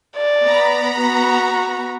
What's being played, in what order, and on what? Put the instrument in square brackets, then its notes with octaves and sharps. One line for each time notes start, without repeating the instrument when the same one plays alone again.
[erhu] D5
[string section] B3 A#5 B5
[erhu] F#4